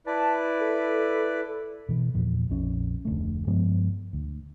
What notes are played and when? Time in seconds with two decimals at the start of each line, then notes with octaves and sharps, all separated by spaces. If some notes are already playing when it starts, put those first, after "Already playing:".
0.06 E4 B4 D5 A5
0.60 A4
1.89 B2 E3
2.14 E2 A#2 F3
2.50 A#1 F2 C#4
3.05 F1 D2 A3
3.47 G2 F3 G#3 B3
4.13 D2